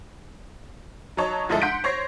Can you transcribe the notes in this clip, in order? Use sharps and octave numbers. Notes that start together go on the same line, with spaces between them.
F#3 D#4 C#5 A5
G1 F3 G#3 E4 A4 E5
F#5 C6 G6 B6 D7
C5 C#5 G#6 A#6 C7